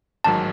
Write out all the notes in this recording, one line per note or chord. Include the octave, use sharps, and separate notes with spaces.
A1 G#2 D#3 F#3 A5